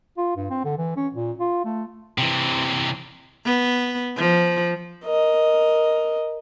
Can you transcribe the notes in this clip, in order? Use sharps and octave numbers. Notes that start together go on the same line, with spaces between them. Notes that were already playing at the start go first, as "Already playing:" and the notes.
F4
G2
C4
D3
E3
C#4
A#2
F4
A3
C3 E3
B3
F3
A#4 D#5